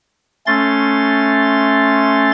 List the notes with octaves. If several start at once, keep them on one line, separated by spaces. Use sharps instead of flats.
A3 C#4 C6 A6